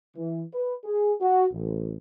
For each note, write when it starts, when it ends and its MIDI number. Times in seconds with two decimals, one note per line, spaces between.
0.16 0.43 52
0.53 0.73 71
0.84 1.13 68
1.21 1.45 66
1.52 1.95 33